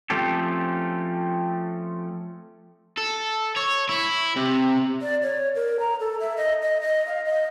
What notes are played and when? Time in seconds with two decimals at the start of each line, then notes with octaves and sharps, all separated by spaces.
0.10 F3 A3 C4 C#4 G4 A4
2.97 A4
3.56 C#5
3.89 E4
4.36 C3
5.02 D5
5.23 C#5
5.55 A#4
5.80 A#5
6.00 A4
6.20 E5
6.37 D#5
6.63 D#5
6.81 D#5
7.06 F5
7.25 D#5